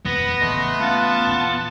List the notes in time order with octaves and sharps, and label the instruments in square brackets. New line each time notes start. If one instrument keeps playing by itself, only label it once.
[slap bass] D#1 F2 [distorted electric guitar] B3 [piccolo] A#6
[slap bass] A1 C#3 [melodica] A3 D#5 C6
[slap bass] A3 C#4 [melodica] F4 F#5 [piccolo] A5
[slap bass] A#1 E2